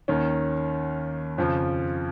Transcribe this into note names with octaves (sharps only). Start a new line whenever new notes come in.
D#2 D#3 C#4
F2 C#3 F3